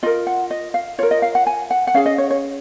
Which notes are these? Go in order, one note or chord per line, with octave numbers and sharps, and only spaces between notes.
F4 A#4 D#5
F#5
D#5
F5
F4 A#4 C#5
D#5
F5
F#5
G#5
F#5
F#5
C#4 G#4 F5
D#5
C#5
C#5